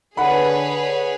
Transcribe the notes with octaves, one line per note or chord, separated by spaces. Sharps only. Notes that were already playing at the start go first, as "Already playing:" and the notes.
D3 G#4 B4 C#5 F#5 B5